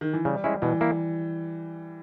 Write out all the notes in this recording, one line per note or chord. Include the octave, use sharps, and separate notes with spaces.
D#3
E3
C#3 G3
G#3 C#4 E4
B2 E3
A#3 E4